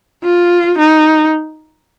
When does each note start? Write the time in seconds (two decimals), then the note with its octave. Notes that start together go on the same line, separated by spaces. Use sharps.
0.24 F4
0.79 D#4